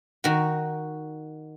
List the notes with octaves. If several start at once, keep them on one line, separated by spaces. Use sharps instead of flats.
D#3 F#4